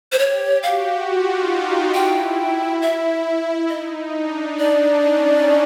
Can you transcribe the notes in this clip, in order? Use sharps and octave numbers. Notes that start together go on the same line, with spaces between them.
C5
G4 C#5
F#4 F5
F4
D#4
D#4
E4 G5
E5
D#4 D#5
D4
D4 D5
C#4